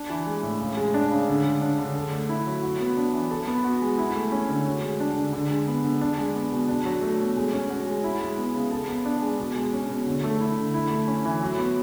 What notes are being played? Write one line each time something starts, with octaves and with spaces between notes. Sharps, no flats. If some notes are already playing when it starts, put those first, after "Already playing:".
Already playing: D4
E3
G#3
A2
C#3
G#3
D4
C#3
D3
G#3
D4
D3
A4
A3
E4
F#3
F#4
B3
D4
E3
A4
B3
F#4
G#3
E4
A3
C#4
D3
F#4
G#3
D4
D3
D3
G#3
B3
D3
D4
G#3
B3
B2
D4
F#3
A3
B2
G#3
C#4
F#4
G#3
E4
G#3
B3
C#3
A4
B3
D4
G#3
B2
G#3
C#4
B2
D3
A3
E4
D3
E4
A3
C#4
E3
F#3
B3